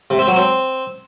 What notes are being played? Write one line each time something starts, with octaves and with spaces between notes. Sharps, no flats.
C3
C4
F#3
C4